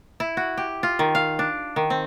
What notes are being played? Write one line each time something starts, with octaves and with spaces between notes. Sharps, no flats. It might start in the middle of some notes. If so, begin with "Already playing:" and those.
E4
F#4
G4
F4
D#3
F5
D4
D#3
C4